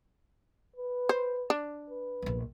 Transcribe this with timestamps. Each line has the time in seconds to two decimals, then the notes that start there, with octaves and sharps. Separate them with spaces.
0.76 B4
1.09 C5
1.50 D4
1.90 B4
2.22 A#1 E2